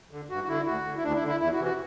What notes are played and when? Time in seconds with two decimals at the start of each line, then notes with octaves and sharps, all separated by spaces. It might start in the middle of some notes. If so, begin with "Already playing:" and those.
0.11 D3
0.30 G2 F#4
0.44 F#4
0.48 D3 E4
0.67 D2 F#4
0.85 D3
0.97 E4
1.03 D2 D4
1.16 E4
1.21 D3
1.28 E4
1.40 E2 E4
1.53 F#4
1.58 C3 E3
1.65 F#4